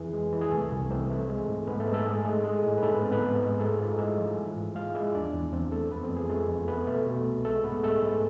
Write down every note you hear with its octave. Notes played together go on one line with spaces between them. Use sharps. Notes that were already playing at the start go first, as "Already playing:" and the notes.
Already playing: F2 E3 G#4
G#3
E3
G#4
C2 A3 A4
C2
E3 C4 C5
A3
G#3
G#2
G#2 B3 B4
A3 A4
G#2
A3 A4
G#3 G#4
G#3 A3 A4
G#3
A2
B4
G#2 A3 A4
B3 B4
G#2 C4 C5
B3 B4
G#2
G#2
G#3 A3 A4
G#2 F4
G#3 E4 E5
F3
E3
G#2
G#3 F4 F5
G#3 E4 E5
E2 D4 D5
E2
E2 C4 C5
A3 A4
F2 B3 B4
C4 C5
F2
G#4
G#3 A3 A4
F2
A3 B3 B4
B2 A3 A4
B2
C2
G#3 A3 A4
G#2 B3 B4
G#3 A3 A4
G#2